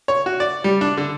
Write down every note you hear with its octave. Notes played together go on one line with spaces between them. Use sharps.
C#5
F#4
D5
G3
D4
D3